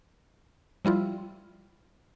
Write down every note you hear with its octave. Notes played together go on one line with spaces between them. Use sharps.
F3 G3 E4 F4